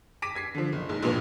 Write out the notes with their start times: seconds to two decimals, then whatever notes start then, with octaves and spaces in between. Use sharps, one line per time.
0.22 D6 A#6 B6 D#7
0.35 G#6 B6 C7
0.54 D3 F3
0.72 F#1
0.89 A#1 G#2
1.03 A#1 G2 A#2 B4 F7